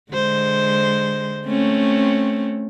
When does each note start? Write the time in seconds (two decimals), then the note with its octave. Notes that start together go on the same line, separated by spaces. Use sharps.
0.12 D3 G#3 C5
1.46 A3 C4 C#4